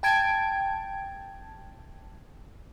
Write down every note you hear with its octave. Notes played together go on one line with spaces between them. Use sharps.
G5 A5 G#6 D7